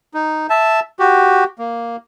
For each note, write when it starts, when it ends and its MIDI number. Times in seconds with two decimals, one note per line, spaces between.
0.14 0.47 63
0.50 0.80 76
0.50 0.80 81
0.99 1.44 66
0.99 1.44 67
1.59 1.96 58